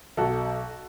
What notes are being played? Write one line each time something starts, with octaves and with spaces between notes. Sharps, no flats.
B1 F#4 A4